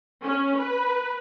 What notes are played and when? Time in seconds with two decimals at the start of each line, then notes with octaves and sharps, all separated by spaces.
0.24 C#4
0.58 B4